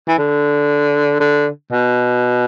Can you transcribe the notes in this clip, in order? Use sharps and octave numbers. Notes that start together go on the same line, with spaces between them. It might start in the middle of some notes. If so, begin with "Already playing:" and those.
E3
D3
D3
B2